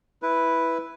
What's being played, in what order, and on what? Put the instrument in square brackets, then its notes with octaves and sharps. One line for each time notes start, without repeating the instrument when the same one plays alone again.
[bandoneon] E4 B4